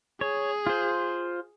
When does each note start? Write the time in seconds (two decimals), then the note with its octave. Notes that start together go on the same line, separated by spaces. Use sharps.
0.21 G#4 C#5
0.67 F4 C5